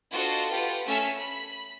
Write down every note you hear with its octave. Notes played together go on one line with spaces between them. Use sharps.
D4 F4 F#4 A4 C5 D#5
F4 G4 B4 F#5
A3 C#4 E5 E6 F6 B6
B5